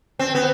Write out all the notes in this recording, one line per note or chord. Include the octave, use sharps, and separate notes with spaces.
C4
B3